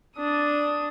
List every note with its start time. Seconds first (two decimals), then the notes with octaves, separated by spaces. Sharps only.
0.17 D4 D#6